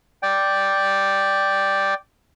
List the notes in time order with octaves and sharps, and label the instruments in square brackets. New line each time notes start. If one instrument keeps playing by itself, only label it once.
[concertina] D5 G5